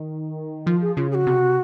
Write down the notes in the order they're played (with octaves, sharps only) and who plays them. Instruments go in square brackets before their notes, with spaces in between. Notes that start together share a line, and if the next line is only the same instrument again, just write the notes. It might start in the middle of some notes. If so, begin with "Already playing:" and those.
Already playing: [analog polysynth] D#3
[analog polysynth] F3 [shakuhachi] F4
[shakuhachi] G#4
[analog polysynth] C#3 [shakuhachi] F4
[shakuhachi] G#4
F#4
[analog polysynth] C3